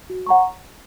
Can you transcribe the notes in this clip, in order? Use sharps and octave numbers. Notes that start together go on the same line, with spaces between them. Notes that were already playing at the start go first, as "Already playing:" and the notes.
F#4
C#5 F#5 A#5 C#6